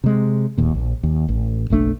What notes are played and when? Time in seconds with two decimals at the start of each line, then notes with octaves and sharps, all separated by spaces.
0.04 C3 G#3
0.58 D1 D#2 A#2
0.74 A#1
1.03 D#2
1.29 A1
1.70 F#1 B1 A3 D4